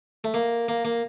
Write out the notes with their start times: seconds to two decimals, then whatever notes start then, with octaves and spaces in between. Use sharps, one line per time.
0.24 A3
0.34 A#3
0.68 A#3
0.85 A#3